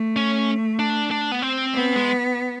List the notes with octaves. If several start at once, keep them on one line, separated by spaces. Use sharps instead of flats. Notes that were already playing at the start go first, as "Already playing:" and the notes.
Already playing: A3
C#4
D4
D4
B3
C4
B3
G#3